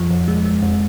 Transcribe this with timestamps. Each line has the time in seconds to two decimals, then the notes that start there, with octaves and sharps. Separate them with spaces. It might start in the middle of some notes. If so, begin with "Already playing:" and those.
Already playing: F2 F3
0.11 F2
0.28 G#3
0.45 G#3
0.62 F2